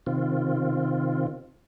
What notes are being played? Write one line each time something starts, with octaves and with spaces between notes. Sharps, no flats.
C3 D#3 C4 F4